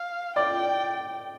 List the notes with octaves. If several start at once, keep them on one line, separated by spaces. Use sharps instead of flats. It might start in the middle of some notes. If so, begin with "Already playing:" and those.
Already playing: F5
D5 G5